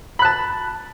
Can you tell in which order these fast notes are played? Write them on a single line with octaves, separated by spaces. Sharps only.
B5 F#6 A5